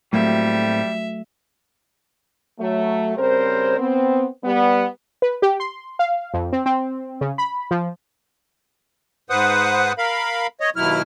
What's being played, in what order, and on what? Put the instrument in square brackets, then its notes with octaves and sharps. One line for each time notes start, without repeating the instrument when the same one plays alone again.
[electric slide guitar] A2 A#3 C4 [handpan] F#3 A3 [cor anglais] G3 [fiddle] E5
[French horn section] F#3 A3
C#3 G3 C4 A#4 C5
B3 C4
G3 B3
[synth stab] B4
G4
C6
F5
F2
C4
C4
C#3
B5
F3
[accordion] G#2 B4 C5 F#5 D#6
A#4 F5 B5
C#5 D#5
D#2 B2 F#3 E4 F6